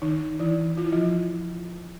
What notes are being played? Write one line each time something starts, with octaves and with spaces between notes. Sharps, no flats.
D#3 D#4
E3 E4
F4
E4
F3 F4